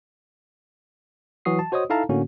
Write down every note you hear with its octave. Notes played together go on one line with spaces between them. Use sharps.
E3 F#3 F#4 D#6 C7
A5
F#4 C5 C#5 D#5 D#6
D#4 E4 A4 F5 A5 A#5
A2 D3 A#3 C#4 F#4